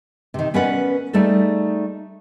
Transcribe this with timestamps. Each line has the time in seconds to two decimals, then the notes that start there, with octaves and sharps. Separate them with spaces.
0.34 C3 D#3
0.54 B3 C#4 A#4 B4 D5 F#5
1.13 G3 A3 D#4 G#4 A4